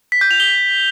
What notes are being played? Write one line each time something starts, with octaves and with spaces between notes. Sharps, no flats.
B6
G6
F7
G7